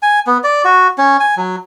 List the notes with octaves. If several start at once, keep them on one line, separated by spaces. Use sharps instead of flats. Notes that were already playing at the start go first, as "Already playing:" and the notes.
G#5
B3
D5
F#4
C#4
G#5
F#3